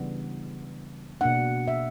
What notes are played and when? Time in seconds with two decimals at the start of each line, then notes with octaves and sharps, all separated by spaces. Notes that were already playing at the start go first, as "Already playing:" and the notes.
Already playing: C#3 E3 G3 B3 D4
1.21 B2 A#3 D4 F#5
1.68 E5